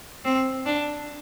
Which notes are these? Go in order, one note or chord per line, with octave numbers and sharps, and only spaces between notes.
C4
D4